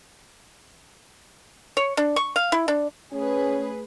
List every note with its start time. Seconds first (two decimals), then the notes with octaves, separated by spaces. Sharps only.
1.77 C#5
1.97 D4
2.16 C#6
2.36 F5
2.52 E4
2.68 D4
3.13 A3 C#4 G#4 B4